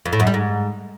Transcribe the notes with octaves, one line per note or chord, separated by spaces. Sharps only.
F2
A2
F#2
G3
G#2